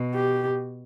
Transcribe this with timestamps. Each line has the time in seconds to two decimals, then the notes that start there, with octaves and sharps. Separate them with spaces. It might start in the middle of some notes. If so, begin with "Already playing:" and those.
Already playing: B2
0.15 G4